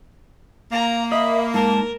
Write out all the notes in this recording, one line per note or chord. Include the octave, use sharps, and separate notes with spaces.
A#3 F5 A#5
D#5 E5 B5
G#2 A#4 A5